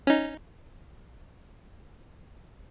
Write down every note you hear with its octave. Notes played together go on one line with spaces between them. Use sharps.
C#4 D#4